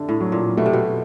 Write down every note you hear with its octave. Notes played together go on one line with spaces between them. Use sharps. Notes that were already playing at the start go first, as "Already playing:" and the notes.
Already playing: D3 A3
A2
F#3
A#2
B2 A3
C3
B2